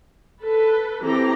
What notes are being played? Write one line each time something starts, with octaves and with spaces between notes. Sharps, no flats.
A4 B4
E3 C4 G4 A4 A#5